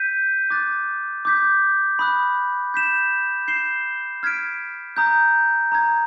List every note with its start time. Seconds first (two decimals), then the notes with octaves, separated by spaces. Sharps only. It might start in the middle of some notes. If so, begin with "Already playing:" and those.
Already playing: G6 B6 D#7
0.50 D6 F#6 A6
1.25 D6 G6 B6
1.99 B5 D#6 F#6
2.74 G6 B6 E7
3.48 G6 C7 E7 G7
4.23 F6 G#6 B6 D7
4.96 A#5 D#6 G6
5.72 A#5 D#6 G#6